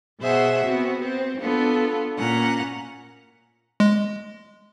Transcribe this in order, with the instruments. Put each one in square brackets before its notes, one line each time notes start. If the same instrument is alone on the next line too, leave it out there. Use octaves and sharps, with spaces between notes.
[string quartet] B2 G#4 C5 E5 F#5
B3 C4 F#4
C4 C5
B3 D4 F4 A4
A#2 C#4 F#5 A#5
[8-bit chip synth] G#3